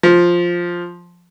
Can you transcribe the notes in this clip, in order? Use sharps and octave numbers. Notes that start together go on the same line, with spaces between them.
F3